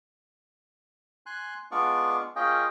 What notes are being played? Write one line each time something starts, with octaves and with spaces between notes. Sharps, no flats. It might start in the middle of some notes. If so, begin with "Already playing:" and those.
G#5 C6 F#6
G#3 B3 D4 F4 D5 C#6
A#3 C#4 F4 G#4 D#5 G5